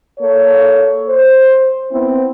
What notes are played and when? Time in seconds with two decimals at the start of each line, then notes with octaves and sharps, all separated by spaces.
0.19 A#3 A4 C#5
1.08 C5
1.91 B3 C4 E4